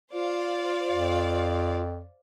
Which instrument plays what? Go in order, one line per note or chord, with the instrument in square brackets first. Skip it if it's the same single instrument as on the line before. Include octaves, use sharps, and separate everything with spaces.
[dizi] F4 [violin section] C5 D5 F5
[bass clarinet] F2